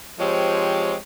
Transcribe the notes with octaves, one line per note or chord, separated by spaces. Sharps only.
F3 G#3 C4 G4 C#5